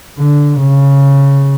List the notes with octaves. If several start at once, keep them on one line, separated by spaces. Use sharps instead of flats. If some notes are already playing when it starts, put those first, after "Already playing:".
D3
C#3